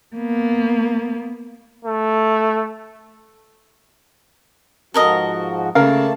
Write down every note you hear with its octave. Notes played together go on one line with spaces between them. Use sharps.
A#3 B3
A3
G#2 F3 F#4 A4 A#4 D#5
C#3 A3 A#3 A#4 F5 A5